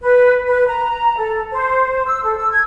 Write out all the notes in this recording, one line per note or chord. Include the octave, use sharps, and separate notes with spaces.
B4
B4
A#5
A4
C5
E6
A4
E6
G#6